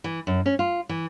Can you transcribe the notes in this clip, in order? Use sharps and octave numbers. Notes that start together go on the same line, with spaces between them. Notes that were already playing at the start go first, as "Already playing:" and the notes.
E3
F#2
C#4
F4
E3